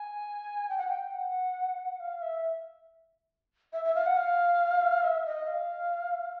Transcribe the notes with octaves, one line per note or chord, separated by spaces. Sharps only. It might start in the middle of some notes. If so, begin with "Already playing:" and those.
Already playing: G#5
G5
F#5
G5
F#5
F5
E5
E5
E5
F5
F#5
F5
E5
D#5
F5